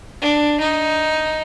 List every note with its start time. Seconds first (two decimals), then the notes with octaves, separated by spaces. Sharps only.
0.21 D4
0.60 D#4